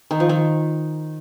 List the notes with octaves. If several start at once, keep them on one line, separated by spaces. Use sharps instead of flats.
D#3
F3
D#3